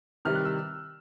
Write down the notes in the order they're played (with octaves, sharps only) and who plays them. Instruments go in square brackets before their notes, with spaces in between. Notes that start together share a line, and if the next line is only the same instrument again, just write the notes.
[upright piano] C3 D#3 G3 F6
F#6
E6